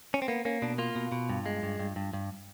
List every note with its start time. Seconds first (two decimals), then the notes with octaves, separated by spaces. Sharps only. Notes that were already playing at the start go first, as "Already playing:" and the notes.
0.14 C#4
0.22 C4
0.28 A#3 B3
0.45 A#3 C#4
0.62 B2 D4
0.78 A#3 F4
0.96 B2
1.12 B2
1.30 G2
1.46 G#3
1.63 G2
1.79 G2
1.96 G2
2.13 G2